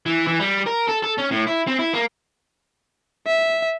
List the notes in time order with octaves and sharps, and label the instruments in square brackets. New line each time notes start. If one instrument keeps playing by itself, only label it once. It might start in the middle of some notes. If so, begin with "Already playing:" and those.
[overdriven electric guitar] E3
E3
G3
A#4
A4
A4
C#4
A2
E4
C4
E4
A#3
[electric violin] E5